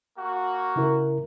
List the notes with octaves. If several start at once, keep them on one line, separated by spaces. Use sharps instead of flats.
A#3 F#4
C#3 E4 A#4